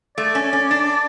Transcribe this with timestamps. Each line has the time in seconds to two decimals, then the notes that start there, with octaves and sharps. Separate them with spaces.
0.18 A3 D5
0.35 C#4
0.53 C#4
0.71 D4